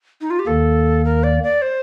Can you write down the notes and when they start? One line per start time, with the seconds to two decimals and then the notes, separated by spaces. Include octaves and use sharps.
0.21 D#4
0.30 F4
0.39 G4
0.47 D#2 D#3 A#3 A4
1.05 A#4
1.24 D5
1.43 D5
1.62 C5